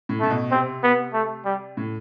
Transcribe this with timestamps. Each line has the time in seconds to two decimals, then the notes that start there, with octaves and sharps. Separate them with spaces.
0.09 A2
0.20 A2 A3
0.30 B2
0.51 C3 C4
0.83 B3
1.14 A3
1.45 G3
1.77 A2